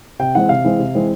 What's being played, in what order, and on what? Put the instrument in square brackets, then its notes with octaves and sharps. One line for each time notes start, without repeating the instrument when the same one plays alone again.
[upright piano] C3 G5
E3 G#3 C4 F#5
C3 F5
E3 G#3 C4
C3
E3 G#3 C4